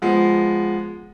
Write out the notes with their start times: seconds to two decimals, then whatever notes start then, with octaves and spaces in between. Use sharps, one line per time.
0.02 F3 G#3 B3